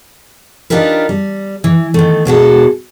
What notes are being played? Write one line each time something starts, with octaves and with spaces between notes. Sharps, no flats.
D4 D#4 F4 G4 A#4 B4
G3
E3
D#3 A3
B2 G#3 F#4 A4